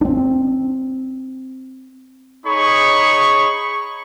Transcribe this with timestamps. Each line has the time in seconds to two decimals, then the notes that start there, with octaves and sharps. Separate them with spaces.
0.01 C4 D4
2.45 D#4 G#4 C#5 B5 C#6